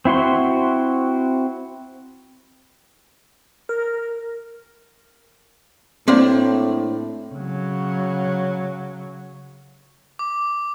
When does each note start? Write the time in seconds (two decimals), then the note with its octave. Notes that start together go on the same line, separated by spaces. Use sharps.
0.05 C4 E4 F#4 C6
3.69 A#4
6.08 A2 A#3 C4 D4
7.33 C#3 F#3
10.19 D6